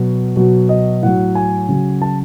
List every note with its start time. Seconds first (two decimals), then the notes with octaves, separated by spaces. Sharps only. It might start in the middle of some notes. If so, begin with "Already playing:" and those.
Already playing: B2 F#3
0.36 B2 F#3
0.69 D#5
1.02 A2 F#3 F#5
1.35 G#5
1.69 C#3 F#3
2.02 A5